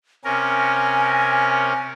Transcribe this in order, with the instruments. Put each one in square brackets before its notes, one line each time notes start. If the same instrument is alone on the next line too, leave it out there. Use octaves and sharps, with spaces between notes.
[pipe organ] C3 C#4 A#4 [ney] G#5